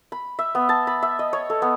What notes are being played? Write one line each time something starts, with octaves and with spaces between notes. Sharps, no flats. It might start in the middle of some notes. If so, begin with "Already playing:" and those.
B5
E5
B3
A5
B5
E5
D#5
C#5
A4
B3